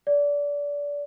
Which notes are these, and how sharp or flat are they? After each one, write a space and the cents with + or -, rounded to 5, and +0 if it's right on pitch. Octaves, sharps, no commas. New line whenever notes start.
D5 -25